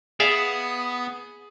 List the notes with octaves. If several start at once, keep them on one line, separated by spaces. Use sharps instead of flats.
B3 G#4 D5 E5 F5